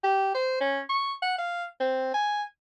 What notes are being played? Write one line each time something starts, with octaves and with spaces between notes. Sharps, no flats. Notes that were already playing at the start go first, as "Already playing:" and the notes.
G4
C5
C#4
C#6
F#5
F5
C4
G#5